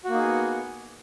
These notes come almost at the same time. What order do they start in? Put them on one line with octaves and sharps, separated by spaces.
F#4 A#3 D#4 G#4 B3